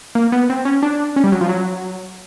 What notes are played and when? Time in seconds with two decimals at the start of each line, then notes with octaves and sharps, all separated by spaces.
0.15 A#3
0.32 B3
0.50 C4
0.65 C#4
0.83 D4
1.16 C#4
1.24 G3
1.32 F#3
1.41 F3
1.49 F#3